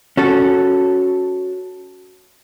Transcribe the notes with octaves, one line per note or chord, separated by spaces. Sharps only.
C#4 F#4 A4